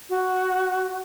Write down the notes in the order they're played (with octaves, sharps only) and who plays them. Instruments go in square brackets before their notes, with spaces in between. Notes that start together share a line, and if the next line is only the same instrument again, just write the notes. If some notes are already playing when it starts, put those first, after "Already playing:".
[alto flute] F#4